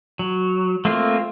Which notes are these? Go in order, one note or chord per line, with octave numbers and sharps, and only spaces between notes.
F#3
A3 A#3 C4 F4